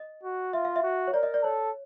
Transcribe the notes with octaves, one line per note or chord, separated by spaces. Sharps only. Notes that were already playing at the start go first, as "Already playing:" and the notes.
Already playing: D#5
F#4
F4 E5
F5
E5
F#4
C#5
A#4 D5
D#5
D5
A4 C#5